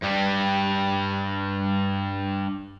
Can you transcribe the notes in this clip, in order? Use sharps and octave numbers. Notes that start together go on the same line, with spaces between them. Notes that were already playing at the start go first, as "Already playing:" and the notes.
G2 G3